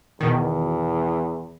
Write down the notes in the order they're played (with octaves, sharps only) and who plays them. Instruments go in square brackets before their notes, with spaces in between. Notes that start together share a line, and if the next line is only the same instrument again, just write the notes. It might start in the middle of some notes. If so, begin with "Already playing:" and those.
[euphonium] E2 [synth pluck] B2 D#3